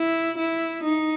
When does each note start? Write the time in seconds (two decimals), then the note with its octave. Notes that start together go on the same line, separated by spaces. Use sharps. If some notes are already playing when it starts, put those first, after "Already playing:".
Already playing: E4
0.38 E4
0.83 D#4